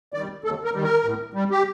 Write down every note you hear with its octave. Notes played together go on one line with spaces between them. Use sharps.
D#3 G3 D5
D#2 A4
A#4
D#3 G3
A#4
A2
G3
G4